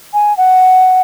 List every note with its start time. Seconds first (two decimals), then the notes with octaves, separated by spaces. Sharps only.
0.14 G#5
0.37 F#5